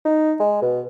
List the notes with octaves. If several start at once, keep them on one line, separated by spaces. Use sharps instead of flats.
D#4
G#3
B2